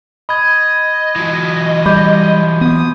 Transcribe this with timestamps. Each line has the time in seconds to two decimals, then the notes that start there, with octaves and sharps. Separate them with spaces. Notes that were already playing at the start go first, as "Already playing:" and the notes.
0.29 D#5 B5 G#6
1.16 E3 F#3
1.86 G3 B5 D6 G6
2.61 B3 D#6